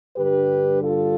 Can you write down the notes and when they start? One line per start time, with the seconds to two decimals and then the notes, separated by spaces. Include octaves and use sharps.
0.17 G2 D3 G3 G4 B4
0.83 F4 A4